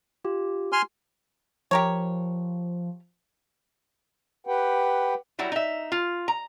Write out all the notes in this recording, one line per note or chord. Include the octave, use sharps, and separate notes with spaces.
F4 G4
G#5 C6 F6
F3 G4 A#4 C#5
G4 B4 F#5 G5
F#3 G3 E4 F#4
D#4 E5
F4
A#5